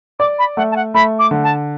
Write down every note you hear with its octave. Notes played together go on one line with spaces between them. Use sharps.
D5 D6
B5
A3 F#5
A5
F#5
A3 B5
D6
D3
A5